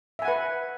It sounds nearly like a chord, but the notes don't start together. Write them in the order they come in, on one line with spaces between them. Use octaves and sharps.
E5 G#5 F#5 B4